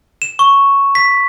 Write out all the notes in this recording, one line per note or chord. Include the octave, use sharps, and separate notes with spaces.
E7
C#6
B6